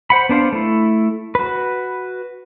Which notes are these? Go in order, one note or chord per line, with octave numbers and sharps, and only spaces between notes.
C5 F#5 B5
B3 D4 C5 F5
A3 E4
F#4 B4